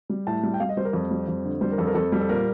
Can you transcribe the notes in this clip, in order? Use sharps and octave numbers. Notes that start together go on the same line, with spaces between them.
G3
A2 A5
G3
G5
G3 F5
D#5
G3 C5
A#4
F2
G3
F2
D3
G3 C5
A#4
F2 A4
A#4
F2 A4
G3
A4
A#2 A#4